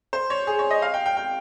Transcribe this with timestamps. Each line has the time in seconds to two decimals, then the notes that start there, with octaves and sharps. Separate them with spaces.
0.13 C5
0.30 C#5
0.47 G#4
0.59 C#5
0.71 D#5
0.82 F5
0.94 G5
1.06 G5
1.17 G5